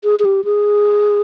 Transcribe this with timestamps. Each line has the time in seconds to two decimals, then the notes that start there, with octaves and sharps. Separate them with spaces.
0.04 G#4
0.19 G#4
0.25 G4
0.45 G#4